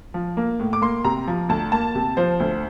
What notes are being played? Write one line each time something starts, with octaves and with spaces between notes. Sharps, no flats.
F3
A#3
A2
D6
A#3 C6
C3 A#5
F3
D2 A5
A#3 A5
C3
F3 C5
D2